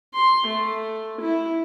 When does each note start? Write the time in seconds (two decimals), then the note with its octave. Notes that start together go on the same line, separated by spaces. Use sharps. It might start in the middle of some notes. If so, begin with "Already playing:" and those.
0.14 C6
0.47 A3
1.21 E4